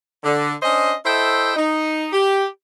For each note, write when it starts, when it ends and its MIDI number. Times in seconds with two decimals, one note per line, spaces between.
0.24 0.53 50
0.62 0.94 61
0.62 0.94 62
0.62 0.94 72
0.62 0.94 75
1.06 1.56 64
1.06 1.56 69
1.06 1.56 72
1.06 1.56 75
1.06 1.56 76
1.06 1.56 79
1.56 2.06 63
2.13 2.46 67